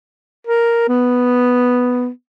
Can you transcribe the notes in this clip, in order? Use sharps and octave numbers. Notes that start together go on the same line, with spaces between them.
A#4
B3